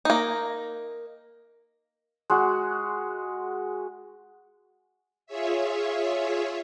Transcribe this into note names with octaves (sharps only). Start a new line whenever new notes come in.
A#3 D#4
G#3 F#4
F4 G#4 C#5 E5